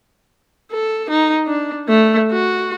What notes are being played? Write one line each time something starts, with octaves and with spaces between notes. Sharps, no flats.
A4
D#4
D4
A3
F#4